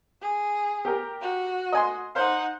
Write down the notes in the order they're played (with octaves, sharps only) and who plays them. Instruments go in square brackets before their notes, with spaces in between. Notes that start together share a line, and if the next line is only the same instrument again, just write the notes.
[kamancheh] G#4
[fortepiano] G4 A#4
[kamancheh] F#4
[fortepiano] D#5 G#5 C6
[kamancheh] D#4 F#5 [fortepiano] C5 F5